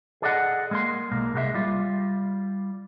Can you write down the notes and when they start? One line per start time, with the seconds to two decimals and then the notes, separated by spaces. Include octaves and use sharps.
0.22 G#4 A4 D5 D#5 F5 F#5
0.71 G#3 A#3 C6
1.12 B1 A#3
1.34 C2 G#3 F4 E5
1.54 G3 F4